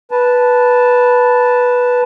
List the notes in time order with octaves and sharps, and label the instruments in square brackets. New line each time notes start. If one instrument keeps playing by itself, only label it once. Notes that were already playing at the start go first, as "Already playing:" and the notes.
[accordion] B4 A5